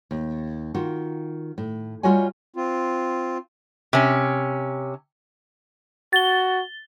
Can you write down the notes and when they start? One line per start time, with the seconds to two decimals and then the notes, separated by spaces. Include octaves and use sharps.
0.11 D#2
0.74 D#3 F4 F#4
1.58 A2
2.03 G3 F4 F#4 C#5 D#5 G#5
2.56 C4 F4
3.93 C3 C#4
6.13 F#4 A6 G7